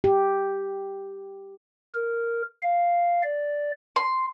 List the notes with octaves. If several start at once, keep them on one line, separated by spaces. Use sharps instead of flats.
G4
A#4
F5
D5
C6